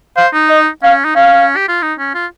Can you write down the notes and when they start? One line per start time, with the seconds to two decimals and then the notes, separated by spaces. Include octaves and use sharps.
0.16 C5 F5
0.33 D#4
0.49 D#5
0.83 C#4 F5
1.05 D#4
1.15 C#4 F5
1.56 G4
1.69 F4
1.82 D#4
1.99 C#4
2.15 F4